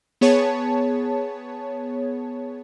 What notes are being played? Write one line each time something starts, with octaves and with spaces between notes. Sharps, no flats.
B3 G#4 C#5 A5